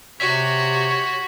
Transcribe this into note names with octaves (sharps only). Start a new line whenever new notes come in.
C3 F#4 G4 C#5 B6